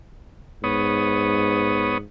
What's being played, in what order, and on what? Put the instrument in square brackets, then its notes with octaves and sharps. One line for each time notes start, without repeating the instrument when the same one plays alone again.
[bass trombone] G#2 [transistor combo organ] B3 C#5 D#6